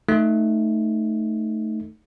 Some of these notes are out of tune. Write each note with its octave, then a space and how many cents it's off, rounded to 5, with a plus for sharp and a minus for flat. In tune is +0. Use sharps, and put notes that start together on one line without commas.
A3 +0 D#4 +0